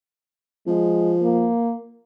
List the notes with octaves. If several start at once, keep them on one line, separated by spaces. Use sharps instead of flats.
F3 G#3
A#3